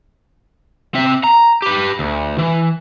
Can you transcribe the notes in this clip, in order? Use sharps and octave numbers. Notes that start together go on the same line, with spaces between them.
C4 E5
A#5
G4 B4
D2
E3